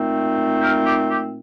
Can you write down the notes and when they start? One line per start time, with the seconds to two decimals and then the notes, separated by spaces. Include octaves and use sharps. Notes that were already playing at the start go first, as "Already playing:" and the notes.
Already playing: A#2 A3 C4 D#4
0.61 G4 A#4
0.85 G4
1.08 G4